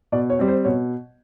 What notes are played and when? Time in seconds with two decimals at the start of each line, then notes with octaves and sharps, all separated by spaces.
0.12 B2 D5
0.30 C#5
0.39 G3 C4
0.48 C5
0.64 B2 C#5